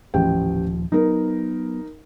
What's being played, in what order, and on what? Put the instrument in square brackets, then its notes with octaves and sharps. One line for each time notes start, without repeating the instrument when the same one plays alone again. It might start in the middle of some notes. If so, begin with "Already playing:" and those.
[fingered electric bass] D#1 F3 [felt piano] A1 G5
[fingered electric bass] F#3 B3 [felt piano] D#4 A#4